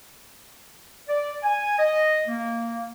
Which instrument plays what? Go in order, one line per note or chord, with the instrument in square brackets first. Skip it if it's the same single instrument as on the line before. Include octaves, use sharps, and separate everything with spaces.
[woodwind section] D5
G#5
D#5
A#3